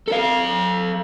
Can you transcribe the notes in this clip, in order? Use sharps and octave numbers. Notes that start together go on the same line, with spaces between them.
A4 F5